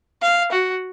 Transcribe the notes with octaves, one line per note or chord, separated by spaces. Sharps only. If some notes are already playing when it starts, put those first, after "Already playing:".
F5
F#4